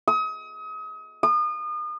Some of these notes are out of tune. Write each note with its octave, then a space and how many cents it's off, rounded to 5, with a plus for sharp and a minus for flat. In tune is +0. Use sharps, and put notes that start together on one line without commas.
D#6 +35
D#6 -35